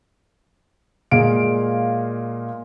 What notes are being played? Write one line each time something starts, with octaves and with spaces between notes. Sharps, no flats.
A#2 G#3 F5 D7